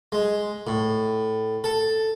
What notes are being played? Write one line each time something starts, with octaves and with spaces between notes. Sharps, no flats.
G#3
A2
A4